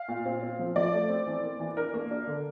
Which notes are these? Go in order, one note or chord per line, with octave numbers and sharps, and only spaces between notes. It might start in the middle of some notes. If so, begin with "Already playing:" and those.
Already playing: F5
A#2
C4
C4
F3
F3 D5
A3
C4
E3
A#3
E3
D4 A#4
A#3
D4
D3